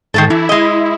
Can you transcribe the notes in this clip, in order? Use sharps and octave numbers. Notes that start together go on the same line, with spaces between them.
G#2 D#3 A3 A4
E3 E4
G#3 D#5